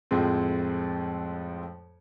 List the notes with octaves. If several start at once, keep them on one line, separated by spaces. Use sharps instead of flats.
F2 A2 F3 G#3 C4